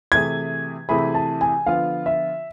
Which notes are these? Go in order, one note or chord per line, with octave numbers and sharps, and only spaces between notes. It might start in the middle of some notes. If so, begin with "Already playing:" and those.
C3 E3 A3 E4 G#4 G#6
C3 E3 A3 E4 G#4 B5
A5
G#5
D3 F3 B3 F4 F5
E5